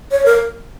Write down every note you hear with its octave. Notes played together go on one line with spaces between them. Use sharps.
C#5
A#4